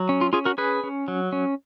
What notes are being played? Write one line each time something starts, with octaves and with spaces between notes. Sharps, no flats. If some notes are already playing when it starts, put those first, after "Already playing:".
Already playing: F#3
C#4
F4
C#4 F4 G#4
F#4 A#4
C#4 G#4 B4
C#4
F#3
C#4